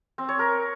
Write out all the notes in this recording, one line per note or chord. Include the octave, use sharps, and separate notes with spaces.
C4
C#5
A#4